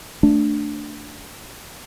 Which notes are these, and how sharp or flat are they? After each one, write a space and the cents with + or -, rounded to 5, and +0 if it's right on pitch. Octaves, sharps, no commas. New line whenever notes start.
A3 +15 D4 +0